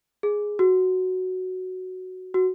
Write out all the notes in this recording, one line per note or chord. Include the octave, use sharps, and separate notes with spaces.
G#4
F#4
F#4